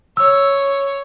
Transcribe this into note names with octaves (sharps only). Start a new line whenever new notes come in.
C#5 E6